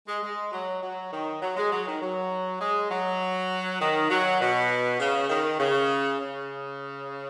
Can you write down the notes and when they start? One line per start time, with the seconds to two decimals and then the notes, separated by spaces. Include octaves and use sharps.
0.08 G#3
0.23 G#3
0.52 F#3
0.82 F#3
1.12 D#3
1.42 F#3
1.56 G#3
1.72 F#3
1.87 D#3
2.01 F#3
2.61 G#3
2.91 F#3
3.80 D#3
4.10 F#3
4.40 B2
5.00 C#3
5.29 D#3
5.60 C#3
6.19 C#3